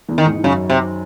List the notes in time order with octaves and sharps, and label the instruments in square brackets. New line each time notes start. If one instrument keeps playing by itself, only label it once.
[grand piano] E2 E3
[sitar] D#3
[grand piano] G#2 G#3
E3
[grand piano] F#2 F#3 [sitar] C#3
[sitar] C3